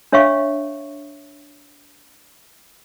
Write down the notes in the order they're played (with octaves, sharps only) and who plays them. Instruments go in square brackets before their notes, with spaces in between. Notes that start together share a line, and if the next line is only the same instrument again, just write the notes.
[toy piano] D4 C#5 E5 F5 C#6